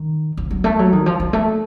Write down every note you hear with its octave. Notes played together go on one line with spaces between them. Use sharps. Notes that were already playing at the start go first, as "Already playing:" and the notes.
Already playing: D#3
F3
F#3
A3
F#3
D#3
F3
F#3
A3